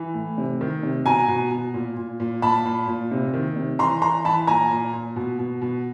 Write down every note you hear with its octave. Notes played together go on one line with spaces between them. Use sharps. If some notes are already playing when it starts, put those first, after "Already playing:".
Already playing: E3
A2
C3
D#3
C3
B2 G#5 A#5
B2
B2
A#2
A#2
A#2
A#2 A5 B5
A#2
A#2
C3
D#3
C3
E3 A#5 C6
E3 A#5 C6
E3 A5 B5
A#2 G#5 A#5
A#2
A#2
B2
B2
B2